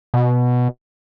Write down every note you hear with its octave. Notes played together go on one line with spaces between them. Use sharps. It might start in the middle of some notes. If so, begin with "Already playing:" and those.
B2